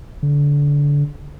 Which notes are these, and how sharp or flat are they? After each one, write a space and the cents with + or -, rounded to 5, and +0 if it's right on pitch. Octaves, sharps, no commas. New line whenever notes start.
D3 -25